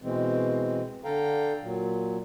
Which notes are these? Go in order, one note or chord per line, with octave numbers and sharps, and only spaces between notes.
B2 E3 G#3 C4
D3 A4 F5 G5 A#5
A#2 F#3